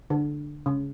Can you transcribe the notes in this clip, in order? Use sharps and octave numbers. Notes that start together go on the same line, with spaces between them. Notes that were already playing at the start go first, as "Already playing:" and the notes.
D3
C#3